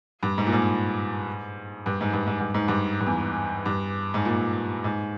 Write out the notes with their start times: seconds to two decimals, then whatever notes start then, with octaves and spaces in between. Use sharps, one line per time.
0.23 G2
0.38 G#2
0.46 A#2
0.52 G#2
1.86 G2
2.01 G#2
2.13 G2
2.27 G#2
2.40 G2
2.54 G#2
2.68 G2
3.00 G2
3.06 E2
3.66 G2
4.14 G#2
4.25 A#2
4.84 G#2